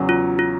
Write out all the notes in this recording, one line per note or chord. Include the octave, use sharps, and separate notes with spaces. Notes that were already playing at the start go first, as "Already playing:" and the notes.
Already playing: E2 C#3 F#3
F4
F4